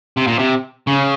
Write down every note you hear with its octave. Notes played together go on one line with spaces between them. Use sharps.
C3
A#2
C3
C#3